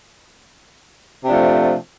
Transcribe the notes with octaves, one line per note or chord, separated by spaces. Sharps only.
C3 F3 A3 D4